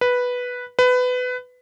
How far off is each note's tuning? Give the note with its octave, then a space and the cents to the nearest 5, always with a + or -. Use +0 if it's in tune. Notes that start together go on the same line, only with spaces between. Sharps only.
B4 -5
B4 +20